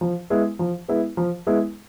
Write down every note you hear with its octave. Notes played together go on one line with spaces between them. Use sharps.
F3
G#3 B3 E4
F3
G#3 B3 E4
F3
G#3 B3 E4